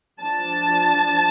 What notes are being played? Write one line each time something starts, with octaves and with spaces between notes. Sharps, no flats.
F3 D4 A5